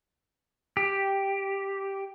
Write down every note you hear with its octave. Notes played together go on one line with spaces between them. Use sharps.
G4